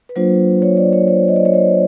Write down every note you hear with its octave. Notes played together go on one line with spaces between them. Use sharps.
B4
F#3 A#3 D4 F4 C5
C#5
D5
C#5
C5
D#5
D5
C#5
C5